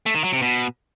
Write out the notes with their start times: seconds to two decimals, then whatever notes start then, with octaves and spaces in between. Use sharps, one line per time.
0.06 A3
0.15 D#3
0.24 F#3
0.33 C3
0.42 B2